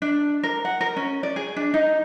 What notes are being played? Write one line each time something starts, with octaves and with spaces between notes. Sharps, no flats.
D4
A#4
F#5
A#4
C#4
D5
G#4
D4
D#4